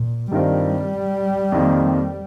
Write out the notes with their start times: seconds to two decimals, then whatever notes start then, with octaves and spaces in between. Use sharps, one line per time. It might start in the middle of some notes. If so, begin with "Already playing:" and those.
Already playing: A#2
0.31 G2 D#3 G3 C4 F4 A#4
1.52 F2 D#3 A#3